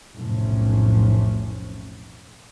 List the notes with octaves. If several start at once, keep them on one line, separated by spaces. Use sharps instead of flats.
F1 B1 A2 C3 C#4